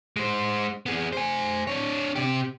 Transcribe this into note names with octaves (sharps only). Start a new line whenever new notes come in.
G#3 C5
B3 G#4
C5 G#5
D4 C#5
C3 G4